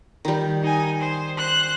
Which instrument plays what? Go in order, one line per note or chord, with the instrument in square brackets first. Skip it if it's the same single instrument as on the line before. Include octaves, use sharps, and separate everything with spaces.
[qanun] D#3 G3
[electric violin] D#4 G#5
C5
C5 F#6